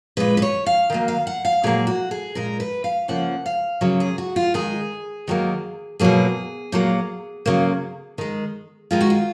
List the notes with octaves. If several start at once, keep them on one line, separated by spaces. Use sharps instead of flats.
A#2 G#3 B4
B4
C#5
F5
D#3 F#3 A#3
F5
F#5
F5
A#2 F#3 A#3 G#4
F#4
G#4
A#2 G#3 A#4
B4
F5
C#3 F3 A#3 F#5
F5
C#3 F#3 A#3
G#4
F#4
F4
D#3 G#3 G#4
D#3 F#3 A#3
B2 F#3 A#3 G#4
A#2 F#3 A#3
C#3 F#3 A#3
D#3 G#3
D#3 G#3 F4
F#4
F4